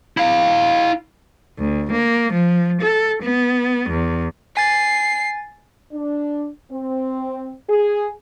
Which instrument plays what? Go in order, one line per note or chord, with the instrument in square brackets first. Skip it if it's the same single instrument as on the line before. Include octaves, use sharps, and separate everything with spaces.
[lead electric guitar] E4 F5
[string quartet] D2
A#3
F3
A4
B3
E2
[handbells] G#5 A6 [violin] C7
[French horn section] D4
C4
G#4